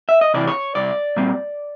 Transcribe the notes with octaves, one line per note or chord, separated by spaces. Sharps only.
E5
D#5
C3 E3 D5
C#5
C2 D5
A#2 G3 C4